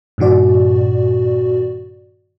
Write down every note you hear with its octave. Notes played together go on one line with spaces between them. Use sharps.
G2 A#2 D#3 F#4 D5